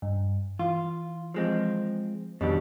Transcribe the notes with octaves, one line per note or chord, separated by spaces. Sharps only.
G2
E3 F4
F3 G#3 C4
F2 B2 D#3 G3 D4